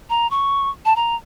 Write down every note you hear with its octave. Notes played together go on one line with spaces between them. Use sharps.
A#5
C#6
A5
A#5